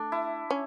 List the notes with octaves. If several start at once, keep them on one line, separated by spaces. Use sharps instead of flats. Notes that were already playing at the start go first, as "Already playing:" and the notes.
Already playing: A3 D4
E4
C#4